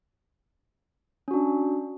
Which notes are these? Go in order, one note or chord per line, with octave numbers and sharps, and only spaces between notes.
C#4 D4 F#4